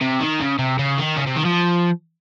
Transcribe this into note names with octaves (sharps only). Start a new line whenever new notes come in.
C3
D#3
C#3
C3
C#3
D#3
C#3
C3
D#3
F3